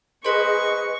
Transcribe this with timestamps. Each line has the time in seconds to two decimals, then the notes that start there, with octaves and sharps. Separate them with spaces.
0.24 G#4 B4 C5 D#5 C#6